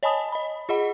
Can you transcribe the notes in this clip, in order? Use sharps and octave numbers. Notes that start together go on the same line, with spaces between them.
C#5 D#5 G#5 A5 B5 D#6
D#5 B5
F4 G#4 D#5 F#5 B5